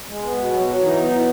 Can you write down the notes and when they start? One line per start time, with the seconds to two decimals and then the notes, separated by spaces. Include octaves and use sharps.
0.08 G#3
0.23 B3
0.37 B2
0.52 F#3
0.67 F#3
0.81 E3 D#4
0.96 B3
1.11 E3